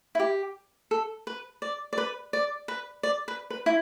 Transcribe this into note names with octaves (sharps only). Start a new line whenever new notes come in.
E4
G4
A4
B4
D5
D5
B4
D5
B4
D5
B4
B4
E4